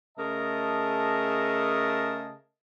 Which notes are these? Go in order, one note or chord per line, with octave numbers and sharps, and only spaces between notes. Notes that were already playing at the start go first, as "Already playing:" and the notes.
C#3 A3 G#4 A#4 D#5 A5